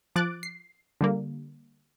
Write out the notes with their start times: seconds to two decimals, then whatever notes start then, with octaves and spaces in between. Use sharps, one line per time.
0.16 F3 D6 F#6 A6 D7
0.43 C7
1.01 D3 G3 A#3